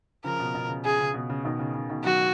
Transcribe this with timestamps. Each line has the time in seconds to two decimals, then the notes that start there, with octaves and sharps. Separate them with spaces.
0.24 C#3 F3 A#4
0.40 B2
0.55 B2
0.69 C#3
0.85 C#3 G#4
1.00 C#3
1.14 B2
1.30 C#3
1.45 B2 D#3
1.59 C#3
1.74 C#3
1.89 B2 D#3
2.04 D#3 F#3 F#4